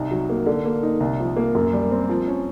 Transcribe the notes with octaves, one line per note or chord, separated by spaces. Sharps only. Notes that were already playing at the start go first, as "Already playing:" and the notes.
Already playing: C2 D#4
F#3
A#3
D3
A#3
D#4
C2
F3
A#3
F#2
G3
C4
F3
C#4